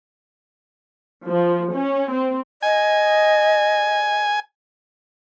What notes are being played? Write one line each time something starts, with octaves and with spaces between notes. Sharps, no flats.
F3
C#4
C4
D#5 G#5